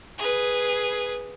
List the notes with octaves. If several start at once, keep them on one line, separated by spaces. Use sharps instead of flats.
G#4 B4